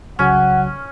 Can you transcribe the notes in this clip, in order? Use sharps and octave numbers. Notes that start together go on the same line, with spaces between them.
C2 C#3 F#3 C#4 F#5